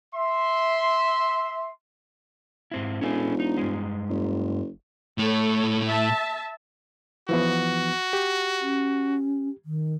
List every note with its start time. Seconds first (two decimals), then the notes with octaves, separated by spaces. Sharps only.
0.15 E5 C6
2.72 G#2 C4 E4
3.01 E1 C#4 A4 G#5
3.40 D#4
3.57 G2 G#3
4.10 F#1
5.18 A2 A3 A4 C#5
5.87 E5 A5
7.29 E3 F3 B3 F#4
8.13 G4
8.61 C#4
9.65 D#3